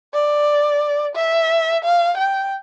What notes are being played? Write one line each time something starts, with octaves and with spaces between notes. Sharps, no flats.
D5
E5
F5
G5